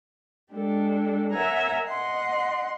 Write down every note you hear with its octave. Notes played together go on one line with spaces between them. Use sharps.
G#3 D4 G4 A4
A#4 C#5 E5 F#5 G#5 A#5
D#5 F#5 C6